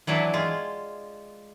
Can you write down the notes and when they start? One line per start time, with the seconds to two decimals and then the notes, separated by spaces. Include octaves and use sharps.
0.07 E3 F#3 D4 E4
0.33 G#3 F4